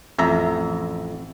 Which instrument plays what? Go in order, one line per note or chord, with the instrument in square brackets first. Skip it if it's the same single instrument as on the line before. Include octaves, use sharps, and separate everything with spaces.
[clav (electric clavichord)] A1 F2 E5 A#5